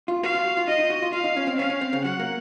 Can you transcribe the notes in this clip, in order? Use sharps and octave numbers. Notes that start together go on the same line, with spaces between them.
F4
F#4 F5
F4
F#4
F4
D#4 D#5
D#4
F#4
F4
F4 F5
D#4
C#4
C4
C#4 F5
C#4
C4
C#3
F#3 F#5
A#3